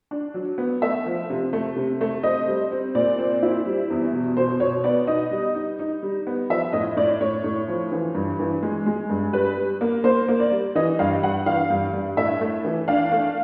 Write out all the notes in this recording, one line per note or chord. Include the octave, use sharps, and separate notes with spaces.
D4
F#3
B3
A3 E5
F3
C3
A3
C3
A3
C4 D#5
G3
C4
A#2 D5
C4
E4
G3
E2
B2
B2 C5
B2 C#5
B3 D5
D#4 D#5
G3
D#4
D#4
G3
B3
F3 E5
A2 D#5
A2 D5
A2 C#5
A2
F3
E3
G2
E3
G#3
G#3
G2
G3 B4
G3
A#3
A#3 C5
A#3
D5
G3
E3 D#5
G2 F5
G2 F#5
E3 F5
G2
G2
A2 E5
A3
E3
D4 F5
A3